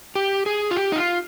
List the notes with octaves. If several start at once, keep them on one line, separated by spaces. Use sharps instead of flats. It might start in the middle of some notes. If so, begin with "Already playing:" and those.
G4
G#4
F4
G4
D#4
F4